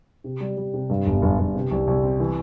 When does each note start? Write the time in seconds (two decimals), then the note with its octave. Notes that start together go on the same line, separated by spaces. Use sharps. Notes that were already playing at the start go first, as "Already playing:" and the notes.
0.24 C3
0.41 G3
0.57 G3
0.74 C3
0.90 G2
1.07 G1
1.22 G1
1.38 G1
1.55 C3
1.71 C2
1.87 C2
2.03 C4
2.20 E3